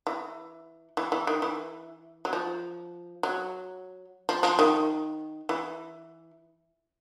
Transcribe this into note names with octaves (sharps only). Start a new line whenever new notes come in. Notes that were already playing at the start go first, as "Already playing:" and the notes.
E3
E3
E3
D#3
E3
F#3
F3
F#3
F3
F3
D#3
E3